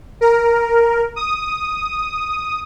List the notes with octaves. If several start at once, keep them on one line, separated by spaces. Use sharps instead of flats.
A#4
D#6